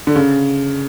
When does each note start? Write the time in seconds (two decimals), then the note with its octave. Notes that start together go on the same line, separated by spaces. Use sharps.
0.07 D3
0.16 C#3